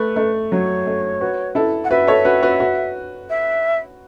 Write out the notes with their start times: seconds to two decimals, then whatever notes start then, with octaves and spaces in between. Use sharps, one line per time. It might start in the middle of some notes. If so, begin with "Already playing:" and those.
Already playing: A3 B4
0.16 A3
0.52 F#3 C#5
0.87 A3
1.21 F#4 B4
1.55 E4 A4
1.84 F#5
1.91 F#4 B4 E5
2.07 A4 C#5
2.25 F#4 B4
2.43 F#4 B4
2.60 F#4 B4
3.30 E5